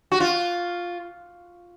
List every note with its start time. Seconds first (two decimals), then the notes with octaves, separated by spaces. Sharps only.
0.12 F#4
0.20 F4